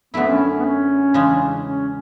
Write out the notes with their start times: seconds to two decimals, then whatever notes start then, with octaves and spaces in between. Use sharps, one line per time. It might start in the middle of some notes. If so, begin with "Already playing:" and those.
0.14 F#2 D3 A3 B3 E4
0.31 C#4
0.60 B3
0.64 C#4
1.14 E2 C#3 G#3 D4
1.65 C#4